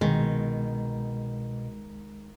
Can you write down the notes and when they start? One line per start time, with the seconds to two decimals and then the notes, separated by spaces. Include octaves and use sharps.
0.01 C2 B2 D#3 G#3